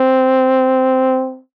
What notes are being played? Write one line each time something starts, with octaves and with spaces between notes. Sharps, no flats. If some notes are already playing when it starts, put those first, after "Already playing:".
Already playing: C4